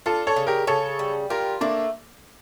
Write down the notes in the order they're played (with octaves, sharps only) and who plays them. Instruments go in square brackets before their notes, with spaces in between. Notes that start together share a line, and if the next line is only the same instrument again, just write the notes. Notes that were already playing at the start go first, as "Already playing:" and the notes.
[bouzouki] D4 [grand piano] F4 A4
[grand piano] A4 C#5
[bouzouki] C#3
[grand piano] G4 A#4
[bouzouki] C#3 [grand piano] A4 C#5
[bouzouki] G3
[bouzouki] F4 [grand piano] G4 A#4
[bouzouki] A3 [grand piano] A#3 D4